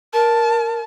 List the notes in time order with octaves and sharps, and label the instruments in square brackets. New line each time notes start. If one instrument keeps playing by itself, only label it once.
[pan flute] A#4 [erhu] A5